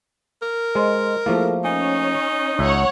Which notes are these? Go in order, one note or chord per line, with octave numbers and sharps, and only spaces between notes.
A#4
G#3 C5 D#5 C6
F3 A3 A#3 E4 G#4 A4
C#4 D#4 G#5
C#2 C#5 E5 F#5